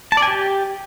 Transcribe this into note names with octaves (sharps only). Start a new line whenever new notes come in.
A5
D5
G#5
G4